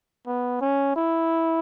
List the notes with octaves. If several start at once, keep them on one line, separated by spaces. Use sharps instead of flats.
B3
C#4
E4